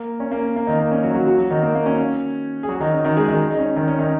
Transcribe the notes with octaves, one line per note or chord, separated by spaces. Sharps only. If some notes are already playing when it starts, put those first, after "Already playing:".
Already playing: A#3
C#4
A#3
A#3
D#3 D#4
A#3
C#4
F#3 F#4
F#3 F#4
F#3 F#4
F#3 F#4
D#3 D#4
A#3
A#3
C#4
G#4
F#3 F#4
D#3 D#4
C#4
D#3 D#4
G#3 G#4
D#3 D#4
D#4
C#4
D#3 D#4
C#4
D#3 D#4